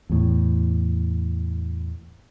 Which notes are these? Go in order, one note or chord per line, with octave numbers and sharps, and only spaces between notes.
E2 A2